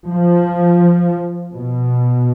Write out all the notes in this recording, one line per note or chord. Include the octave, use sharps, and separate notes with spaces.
F3
B2